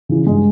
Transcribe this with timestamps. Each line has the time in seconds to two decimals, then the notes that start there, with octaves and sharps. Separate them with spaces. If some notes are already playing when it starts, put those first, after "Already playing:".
0.09 C#3 E3
0.26 G2 G#3